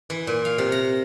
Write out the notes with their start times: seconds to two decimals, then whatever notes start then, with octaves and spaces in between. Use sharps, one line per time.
0.10 E3
0.27 A#2
0.45 F5
0.58 C3
0.72 A#5